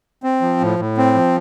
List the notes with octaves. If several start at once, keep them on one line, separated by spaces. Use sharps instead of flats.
C4
F3
A2
A2
C4
F3